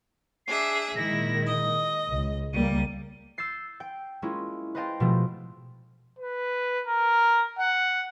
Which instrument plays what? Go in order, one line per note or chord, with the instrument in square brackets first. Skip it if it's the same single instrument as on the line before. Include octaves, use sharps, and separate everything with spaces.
[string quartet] D4 G#4 E5 [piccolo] C7
[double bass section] A#2 D#3 G#3 [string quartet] E4 [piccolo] A#6
[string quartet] D#5 [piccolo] D#6
[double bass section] C#2
[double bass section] C#2 A#3 [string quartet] G3 [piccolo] D#7
[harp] E6 G6 A6 C7
G5
G#3 A#3 C#4 E4 F4
B4 C5 D#5 F5 G5 A5
B2 F3 G#3 A3
[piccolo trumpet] B4
A#4
F#5